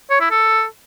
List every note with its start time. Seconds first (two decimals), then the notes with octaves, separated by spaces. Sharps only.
0.10 C#5
0.20 E4
0.31 A4